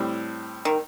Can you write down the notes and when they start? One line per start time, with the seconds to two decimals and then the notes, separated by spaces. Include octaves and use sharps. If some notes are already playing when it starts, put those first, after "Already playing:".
Already playing: A2 G3 C4
0.65 D#3